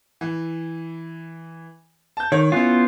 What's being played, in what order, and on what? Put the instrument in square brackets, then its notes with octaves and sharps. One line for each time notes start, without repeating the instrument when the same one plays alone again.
[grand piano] E3
A5 G6
[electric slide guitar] D#3 [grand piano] C#5
[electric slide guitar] B3 F4 [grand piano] C#4 E4